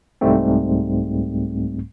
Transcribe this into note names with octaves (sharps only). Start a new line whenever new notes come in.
C2 G#2 G3 A3 C4